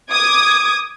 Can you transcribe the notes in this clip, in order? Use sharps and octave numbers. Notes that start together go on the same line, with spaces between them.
D6 D#6 G#6